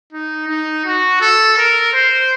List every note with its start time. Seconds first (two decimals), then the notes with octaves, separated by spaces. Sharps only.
0.13 D#4
0.49 D#4
0.86 F#4
1.21 A4
1.58 A#4
1.94 C5